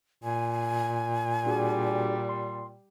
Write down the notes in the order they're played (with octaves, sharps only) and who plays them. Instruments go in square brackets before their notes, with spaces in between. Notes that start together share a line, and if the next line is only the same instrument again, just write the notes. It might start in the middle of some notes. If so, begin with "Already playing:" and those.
[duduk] A#2 [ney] G#5
[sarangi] G3 [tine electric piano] D4 F#4 G#4
[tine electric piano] C6